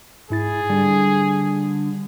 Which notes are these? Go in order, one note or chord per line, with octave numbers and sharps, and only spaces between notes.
G#2 E4 G#4 A6
D3 G3